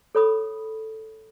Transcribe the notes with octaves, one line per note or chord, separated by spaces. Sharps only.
A4 C#5 B5 D#6